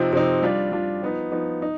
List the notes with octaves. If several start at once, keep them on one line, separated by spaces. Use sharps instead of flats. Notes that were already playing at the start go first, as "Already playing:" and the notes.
Already playing: C3 F3 C4 D#4
C3 F3 C4 D#4
G3 D4 F4
G3 D4 F4
F3 B3 D#4
F3 B3 D#4
D#4